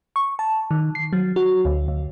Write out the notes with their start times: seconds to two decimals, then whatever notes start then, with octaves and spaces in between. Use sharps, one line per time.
0.16 C#6
0.39 A5
0.71 D#3
0.95 C7
1.13 F#3
1.36 F#4
1.65 D2
1.88 D2